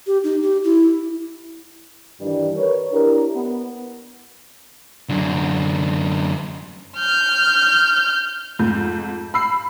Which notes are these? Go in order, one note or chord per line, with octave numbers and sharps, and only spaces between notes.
G4
D#4
G4
E4
G2 D#3 E3 G3 D4 D5
A#4 B4 C#5
D4 E4 G4 A#4
B3
F#2 D3
F6 G6
F2 G#2 G6
B5 E6 C7